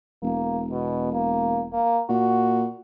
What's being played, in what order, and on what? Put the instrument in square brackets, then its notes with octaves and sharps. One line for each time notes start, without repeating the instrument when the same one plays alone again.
[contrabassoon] E1 [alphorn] A#3
[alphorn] B2
A#3
A#3
[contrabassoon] A#2 [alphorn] F#4